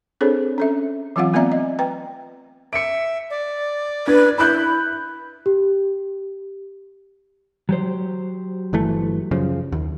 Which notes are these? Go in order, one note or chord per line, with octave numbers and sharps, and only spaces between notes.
C4 D4 G#4 A4 C5 C#5
C#4 A4 E5
E3 F#3 C4 F4 F5 F#5
A3 B3 C4 D5 E5 A#5
D#5
B4 G5 A#5
E5 C#7 D7
D5
D4 B4 G#6
E4 B5 F#6 G6
G4
F#3 G4 C5
G1 E3 A3
F#2 C#3 F3
D#2